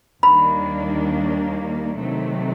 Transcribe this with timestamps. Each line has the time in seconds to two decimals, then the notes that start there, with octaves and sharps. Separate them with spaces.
0.23 D#2 D#3 G3 A#3 D4 B5
1.97 C3 D#3 F#3 A3